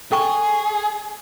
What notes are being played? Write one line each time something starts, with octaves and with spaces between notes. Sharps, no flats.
G#4 A4 G5 C#6